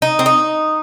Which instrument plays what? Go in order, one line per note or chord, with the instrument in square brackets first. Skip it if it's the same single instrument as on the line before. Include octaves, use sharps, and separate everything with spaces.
[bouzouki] D#4
C4
D#4